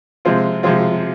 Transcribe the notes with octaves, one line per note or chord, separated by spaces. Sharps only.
C3 F3 G#3 C4 F4
C3 F3 G#3 C4 F4